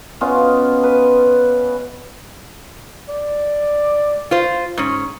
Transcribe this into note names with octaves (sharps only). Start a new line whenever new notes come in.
B3 C#4 F4 D#5
B4
D5
F4 C5
G#2 C#4